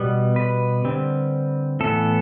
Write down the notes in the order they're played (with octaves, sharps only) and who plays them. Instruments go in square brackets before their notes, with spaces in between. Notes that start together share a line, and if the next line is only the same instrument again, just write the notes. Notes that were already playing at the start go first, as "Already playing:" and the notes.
Already playing: [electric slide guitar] B2 G3 B3
B4
D3 G3 C4
A2 E3 B3 A4